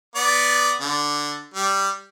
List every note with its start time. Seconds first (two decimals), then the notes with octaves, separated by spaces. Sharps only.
0.15 B3 D5
0.81 D3
1.54 G3